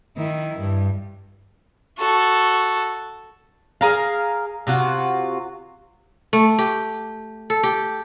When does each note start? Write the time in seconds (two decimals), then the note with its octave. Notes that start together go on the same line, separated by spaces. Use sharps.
0.17 D#3 E4
0.60 G2
1.98 F#4 A4
3.81 G#4 A#4 F5
4.67 C3 F4 F#4
6.33 A3
6.59 G4
7.50 A4
7.63 G4